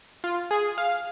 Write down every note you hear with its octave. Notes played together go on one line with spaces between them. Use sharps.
F4
G#4
F5